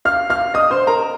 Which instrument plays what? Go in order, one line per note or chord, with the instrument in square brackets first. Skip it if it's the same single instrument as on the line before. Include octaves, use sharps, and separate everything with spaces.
[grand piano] F5 F6
F5 F6
D#5 D#6
C5 C6
A#4 A#5